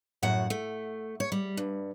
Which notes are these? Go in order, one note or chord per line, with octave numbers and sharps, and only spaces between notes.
F#2 A2 F#4 F#5
A3
C#5
G3
G2